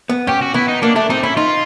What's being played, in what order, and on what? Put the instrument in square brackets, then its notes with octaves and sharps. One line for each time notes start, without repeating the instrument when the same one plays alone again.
[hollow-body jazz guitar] B3
[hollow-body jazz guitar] C#4 [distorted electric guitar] G4
[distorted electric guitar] F#4
[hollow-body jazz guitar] B3 [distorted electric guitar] E4
[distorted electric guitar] D#4
[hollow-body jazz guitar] A#3 [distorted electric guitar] D4
[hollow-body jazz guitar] A3 [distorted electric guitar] D4
[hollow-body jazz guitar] C4 [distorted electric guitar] D#4
[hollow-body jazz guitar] C#4 [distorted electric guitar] E4
[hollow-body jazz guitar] D#4 [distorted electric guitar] F4